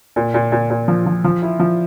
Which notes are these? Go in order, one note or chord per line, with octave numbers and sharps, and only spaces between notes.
A#2
A#2
A#2
A#2
F3
F3
F3
E4
F3